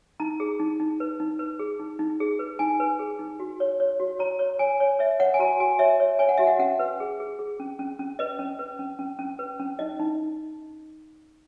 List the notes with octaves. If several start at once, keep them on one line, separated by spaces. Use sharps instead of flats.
D#4 A#5
G#4
D#4
D#4
B4
D#4
B4
G#4
D#4
D#4
G#4
B4
D#4 G#5
B4
G#4
D#4
F#4
C#5
C#5
F#4
C#5 A#5
C#5
C#5 G#5
C#5
C#5 E5
C#5 F#5
G#5
F#4 A#5
F#4 G#5
C#5 E5
C#5
C#5 G#5
F#5
F#4 E5
F#5
C#4 F#5
B4
G#4
G#4
G#4
C#4
C#4
C#4
B4 D#5
C#4
B4
C#4
C#4
C#4
B4
C#4
D#4 D#5
D#4